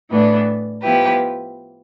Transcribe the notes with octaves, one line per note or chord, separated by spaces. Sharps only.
A2 E3 B3 D4
F3 B3 E4 G4 B4